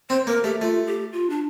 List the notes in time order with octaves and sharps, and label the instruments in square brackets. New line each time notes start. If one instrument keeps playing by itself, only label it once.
[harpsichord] C4 [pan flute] C5
[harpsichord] A#3 [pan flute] A#4
[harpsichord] A3 [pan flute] G4
[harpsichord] A3 [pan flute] F4
[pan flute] G4
F4
D4